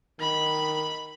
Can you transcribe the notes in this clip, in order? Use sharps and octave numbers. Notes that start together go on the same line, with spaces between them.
D#3 B5